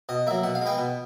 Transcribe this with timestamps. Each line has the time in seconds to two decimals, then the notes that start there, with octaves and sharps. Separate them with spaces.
0.09 B2 D#5
0.27 F#3 A#3 E5
0.44 B2 F#5
0.55 F5
0.62 G#3 B3 G5
0.78 B2